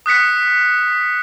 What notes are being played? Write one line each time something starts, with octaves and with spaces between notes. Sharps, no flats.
D#6 F#6 B6 C#7